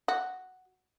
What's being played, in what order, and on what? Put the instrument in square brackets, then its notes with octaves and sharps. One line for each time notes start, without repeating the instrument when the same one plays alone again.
[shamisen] F#4